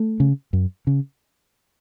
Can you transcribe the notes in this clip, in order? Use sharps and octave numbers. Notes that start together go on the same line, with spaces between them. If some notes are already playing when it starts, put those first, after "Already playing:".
Already playing: A3
C#3
F#2
C#3